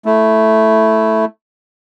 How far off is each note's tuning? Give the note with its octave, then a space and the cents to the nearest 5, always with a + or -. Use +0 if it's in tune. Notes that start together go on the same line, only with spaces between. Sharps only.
A3 +0 E4 +0